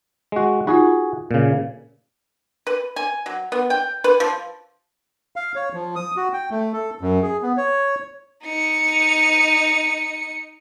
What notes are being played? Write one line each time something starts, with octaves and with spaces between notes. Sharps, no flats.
G#3 F#4
D#4 F4 F#4 G#4
A#2 C#3
B4
G#5
F#3
B3
G5
B4
F3
F5
C#5
F3
D#6
F#4
G5
A3
A4
F#2
G#4
B3
C#5
D#4 C#7